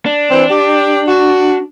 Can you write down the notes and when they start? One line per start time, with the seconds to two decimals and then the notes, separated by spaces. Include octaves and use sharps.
0.06 D4
0.30 E3 C4
0.51 G4
1.07 F#4